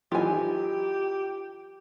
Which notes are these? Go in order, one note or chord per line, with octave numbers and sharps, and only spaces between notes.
E3 F#3 D#4 F4 G4 G#5